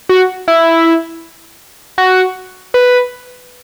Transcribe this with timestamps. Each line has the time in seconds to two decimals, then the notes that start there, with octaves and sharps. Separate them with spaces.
0.09 F#4
0.48 E4
1.98 F#4
2.74 B4